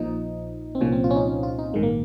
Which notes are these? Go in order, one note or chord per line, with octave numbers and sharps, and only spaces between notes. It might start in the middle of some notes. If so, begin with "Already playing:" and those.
Already playing: A#1 A#2 F3 D#4
C4
C2 A#2 F3 C#4
C4
F4
C#4
D#4
C#4
F4
D#4
A#1 G#2 D#3 G#3
A#3